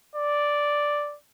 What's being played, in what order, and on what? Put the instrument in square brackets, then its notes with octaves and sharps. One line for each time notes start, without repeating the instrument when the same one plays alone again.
[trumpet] D5